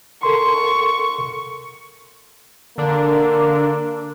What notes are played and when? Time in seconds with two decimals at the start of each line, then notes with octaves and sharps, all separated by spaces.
0.23 A4 A#4 C6 C#6
2.78 D3 A#3 D4